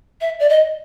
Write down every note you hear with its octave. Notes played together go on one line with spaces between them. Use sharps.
E5
D5
D#5